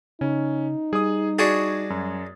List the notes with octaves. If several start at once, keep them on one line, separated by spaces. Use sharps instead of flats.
C#3 C#4 D#4
G3 G#4 D#6
D4 F#4 G#4 C#6 G#6 A6
F#2